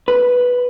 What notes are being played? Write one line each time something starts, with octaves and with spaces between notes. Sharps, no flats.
B4